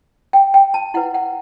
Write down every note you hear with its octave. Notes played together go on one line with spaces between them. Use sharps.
G5
G5
A5
E4 B4 F#5
F#5